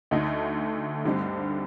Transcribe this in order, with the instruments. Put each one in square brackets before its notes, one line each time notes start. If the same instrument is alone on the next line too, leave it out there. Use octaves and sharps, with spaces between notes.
[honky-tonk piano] D2 D3 A3 D#4
G2 D3 G3 C4 D#4